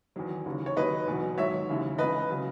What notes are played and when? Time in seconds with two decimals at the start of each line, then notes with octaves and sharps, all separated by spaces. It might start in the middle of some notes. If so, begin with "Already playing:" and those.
0.16 E2 D#3 F#3
0.46 D#2 C#3 E3
0.66 C#5
0.76 D#2 D#3 F#3 B4 D#5
1.07 E2 B2 F#3
1.38 G#2 D#3 F#3 C#5 E5
1.68 D#2 C#3 E3
1.98 C#2 C#3 E3 B4 D#5
2.30 C#3 F#3